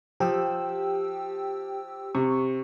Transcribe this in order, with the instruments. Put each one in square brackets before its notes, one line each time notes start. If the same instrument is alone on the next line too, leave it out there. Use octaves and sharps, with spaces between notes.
[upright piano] F3 [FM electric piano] G4 G5 E6
[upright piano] C3 [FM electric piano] C#6